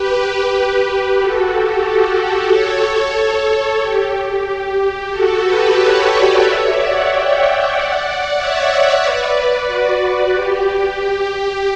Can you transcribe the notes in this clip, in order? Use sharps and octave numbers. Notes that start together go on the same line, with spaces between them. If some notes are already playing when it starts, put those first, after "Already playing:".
Already playing: G4 B4
F#4 A4
G4
F#4 A4
A4 C#5
G4
G4
F#4 A4
G4 B4
A4 C#5
B4 D5
C#5 E5
D5 F#5
E5 G5
D5 F#5
C#5 E5
B4 D5
F#4
G4